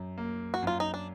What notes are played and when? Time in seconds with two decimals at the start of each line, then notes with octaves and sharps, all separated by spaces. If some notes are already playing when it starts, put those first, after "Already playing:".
Already playing: F#2
0.18 A#3
0.54 F#4
0.62 F#2 F4
0.80 D#4
0.94 D4